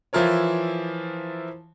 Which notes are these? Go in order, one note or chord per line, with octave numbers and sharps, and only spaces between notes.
E3 F3 E4 F4 A#4 C#5